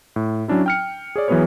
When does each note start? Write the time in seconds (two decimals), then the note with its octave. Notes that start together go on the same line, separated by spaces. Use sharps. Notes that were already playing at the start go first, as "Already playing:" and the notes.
0.16 A2
0.48 F#3 C#4 D4 E4
0.66 G5 F6 C#7
1.16 G#4 C#5 D5
1.28 E3 F#3 B3 G#4 B4 C#5